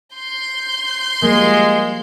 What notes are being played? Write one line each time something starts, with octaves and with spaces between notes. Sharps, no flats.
C6 G6
F3 G3 G#3 A#3 A#4